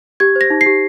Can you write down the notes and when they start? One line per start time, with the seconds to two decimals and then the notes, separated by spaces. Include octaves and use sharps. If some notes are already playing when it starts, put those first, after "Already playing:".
0.20 G4 G#6
0.36 C5
0.41 A#6
0.50 D#4
0.61 C7
0.66 G4